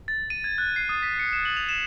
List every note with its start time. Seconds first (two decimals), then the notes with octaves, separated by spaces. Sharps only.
0.08 A6
0.30 D#7
0.44 G#6
0.58 F#6
0.76 C7
0.89 D#6
1.03 B6
1.19 C#7
1.33 E7
1.45 F#7
1.57 F7
1.69 E7